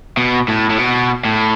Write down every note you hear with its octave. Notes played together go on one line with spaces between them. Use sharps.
B2
A2
A2
B2
A2